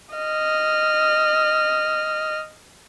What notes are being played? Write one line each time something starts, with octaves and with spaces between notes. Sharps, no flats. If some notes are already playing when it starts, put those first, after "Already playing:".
D#5 F6